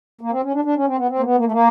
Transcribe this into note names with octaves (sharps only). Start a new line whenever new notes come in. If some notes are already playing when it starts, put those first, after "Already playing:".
A#3
C4
C#4
D4
D4
C#4
C4
B3
C4
A#3
B3
A#3
A3
A#3